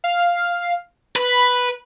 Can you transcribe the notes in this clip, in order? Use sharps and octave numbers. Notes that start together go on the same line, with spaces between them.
F5
B4 B5